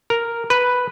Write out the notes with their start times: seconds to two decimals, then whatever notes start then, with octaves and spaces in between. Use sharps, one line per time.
0.10 A#4
0.50 B4